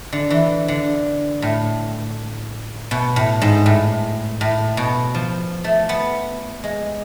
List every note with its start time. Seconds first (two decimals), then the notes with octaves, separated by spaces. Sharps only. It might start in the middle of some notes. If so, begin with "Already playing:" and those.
0.12 D3
0.30 E3
0.68 D3
1.42 A2
2.91 B2
3.16 A2
3.42 G#2
3.66 A2
4.41 A2
4.77 B2
5.14 F3
5.64 A3
5.89 B3
6.64 G#3